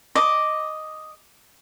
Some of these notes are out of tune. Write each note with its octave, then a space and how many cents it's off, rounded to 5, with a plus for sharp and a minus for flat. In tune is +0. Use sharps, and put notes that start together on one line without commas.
D#5 +0 D6 +0